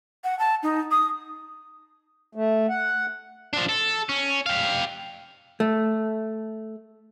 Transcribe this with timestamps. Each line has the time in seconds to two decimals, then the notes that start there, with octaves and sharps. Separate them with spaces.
0.24 F#5
0.39 A5
0.63 D#4
0.91 D#6
2.35 A3
2.69 F#5
3.53 F3 D4
3.69 A4
4.09 C#4
4.46 G4 F5
5.60 A3